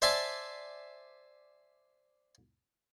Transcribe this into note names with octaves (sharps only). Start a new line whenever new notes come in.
C5 D5 E5 G#5 A5